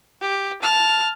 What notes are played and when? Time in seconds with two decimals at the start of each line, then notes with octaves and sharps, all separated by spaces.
0.21 G4
0.62 A5 F6